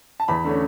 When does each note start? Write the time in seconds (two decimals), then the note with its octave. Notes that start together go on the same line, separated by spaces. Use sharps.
0.20 A5
0.28 E2 B5
0.44 D3 A3 C#4